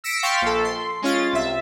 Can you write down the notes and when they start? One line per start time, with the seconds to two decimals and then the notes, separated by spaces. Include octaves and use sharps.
0.04 E6 A#6 B6 C#7 D7
0.23 F5 G5 C6 C#6 A6 B6
0.42 A#1 A4
0.65 C6
1.02 G#3 C#4 F4 A6
1.32 C2 E5